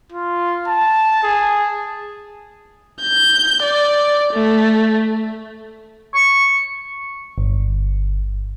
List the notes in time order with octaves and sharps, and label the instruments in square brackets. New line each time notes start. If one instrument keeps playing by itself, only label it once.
[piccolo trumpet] F4
A5
G#4
[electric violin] G6
D5
A3
[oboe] C#6
[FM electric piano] G1